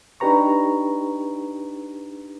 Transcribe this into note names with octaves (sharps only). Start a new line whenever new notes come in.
D4 D#4 G4 B4 A#5 C#6